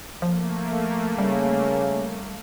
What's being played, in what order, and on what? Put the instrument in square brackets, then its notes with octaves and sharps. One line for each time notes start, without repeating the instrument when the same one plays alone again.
[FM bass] F3 [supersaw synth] A3 A#3
[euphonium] C#3 [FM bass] G3